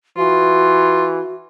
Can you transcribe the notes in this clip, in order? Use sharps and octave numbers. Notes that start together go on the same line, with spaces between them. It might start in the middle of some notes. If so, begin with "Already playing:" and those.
E3 F4 F#4